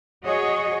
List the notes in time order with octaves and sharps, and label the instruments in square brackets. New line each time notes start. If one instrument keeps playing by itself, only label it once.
[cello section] F#4 G#4 C#5 D#5